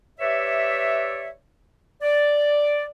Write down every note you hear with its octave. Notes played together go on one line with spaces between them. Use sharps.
G4 B4 C#5 D5 E5
D5